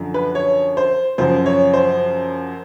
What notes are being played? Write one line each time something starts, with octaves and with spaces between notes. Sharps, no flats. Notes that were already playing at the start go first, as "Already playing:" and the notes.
Already playing: F#2 D3 F3
B4
C#5
C5
F#2 C#3 F3 C5
C#5
C5